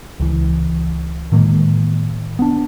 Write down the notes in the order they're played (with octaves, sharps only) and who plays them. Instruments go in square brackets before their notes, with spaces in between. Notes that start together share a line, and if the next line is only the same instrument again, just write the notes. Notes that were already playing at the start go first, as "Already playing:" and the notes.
[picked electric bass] C#2 E3
A2 D#3 G#3 A#3
B3 D4